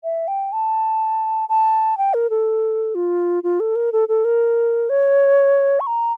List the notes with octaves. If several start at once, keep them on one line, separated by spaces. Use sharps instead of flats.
E5
G5
A5
A5
G5
A#4
A4
F4
F4
A4
A#4
A4
A4
A#4
C#5
C#6
A#5